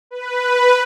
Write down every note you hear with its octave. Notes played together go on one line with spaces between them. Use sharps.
B4